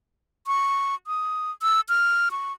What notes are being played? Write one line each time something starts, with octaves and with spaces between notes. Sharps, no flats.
C#6
D#6
E6
F6
C#6